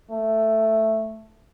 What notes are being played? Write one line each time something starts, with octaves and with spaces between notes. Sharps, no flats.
A3